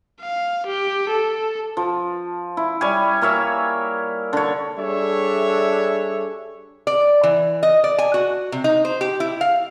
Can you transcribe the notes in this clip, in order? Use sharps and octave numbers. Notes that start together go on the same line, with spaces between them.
F5
G4
A4
F3
E4
G3 C#5 G#5
A#3 A#4 C#5 E5
D3 C#5
G3 D4 G#4 A4 C#5 E5
D5
E3
D#5
D5
G#5
F#4
C3
D#4
C5
G4
E4
F5